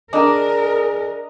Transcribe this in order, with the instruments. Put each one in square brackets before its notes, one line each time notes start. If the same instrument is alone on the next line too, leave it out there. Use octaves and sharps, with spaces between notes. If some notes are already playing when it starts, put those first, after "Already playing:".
[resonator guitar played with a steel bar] D4 [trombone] G#4 [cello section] A#4 [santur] D#5 A#5